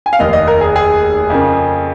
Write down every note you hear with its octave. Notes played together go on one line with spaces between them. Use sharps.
G#5
F5
F1 D#2 D#3 D#5
D#5
A#4
G#4
G#4
F2 C#3 A#3